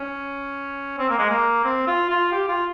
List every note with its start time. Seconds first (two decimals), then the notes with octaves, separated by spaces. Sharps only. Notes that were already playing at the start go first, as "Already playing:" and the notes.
Already playing: C#4
0.99 C4
1.09 A#3
1.19 G#3
1.30 A#3
1.65 C4
1.87 F4
2.09 F4
2.32 G4
2.48 F4